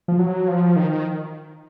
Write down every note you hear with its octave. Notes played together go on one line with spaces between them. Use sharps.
F3
F#3
F3
D#3